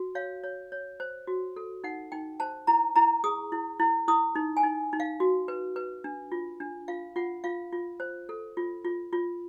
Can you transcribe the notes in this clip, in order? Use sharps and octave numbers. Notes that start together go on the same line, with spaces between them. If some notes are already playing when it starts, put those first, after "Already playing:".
Already playing: F#4
C#5 F5
C#5
C#5
C5
F#4
A4
D#4 F#5
D#4 G5
C5 A5
E4 A#5
E4 A#5
G#4 D#6
E4
E4
E4 D#6
D#4
G#5
D#4
D#4
F5
F#4
B4
B4
D4
F4
D4
F4 F5
F4 F#5
F4 F5
F4
C5
A4
F4
F4
F4